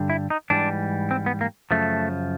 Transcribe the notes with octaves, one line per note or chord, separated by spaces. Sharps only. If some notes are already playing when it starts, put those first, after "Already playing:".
Already playing: G2 D3 G3
E4
D#4
G#2 E3 G3 D4
C4
B3
A#3
F#2 C#3 F3 A3